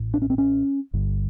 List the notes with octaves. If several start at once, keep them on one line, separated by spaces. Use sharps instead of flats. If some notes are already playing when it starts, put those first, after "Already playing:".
Already playing: A1 A2
D4
C#4
C4
C#4
G1 G2 D3